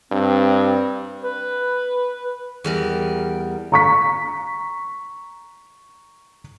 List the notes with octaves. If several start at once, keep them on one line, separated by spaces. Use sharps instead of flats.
G2 C4
B4
E2 G3 A#4
A#5 C#6 B6